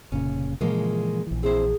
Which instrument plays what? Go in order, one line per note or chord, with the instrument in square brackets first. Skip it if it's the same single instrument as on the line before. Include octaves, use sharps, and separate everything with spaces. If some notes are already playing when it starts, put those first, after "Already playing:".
[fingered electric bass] F1 A#2 C#3 [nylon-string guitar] C#4
[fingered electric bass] A#2 E3 F3 [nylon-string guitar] C#3 G#3 A#3
[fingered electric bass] A#1 E3
[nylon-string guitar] C4 E4 C5 [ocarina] G#4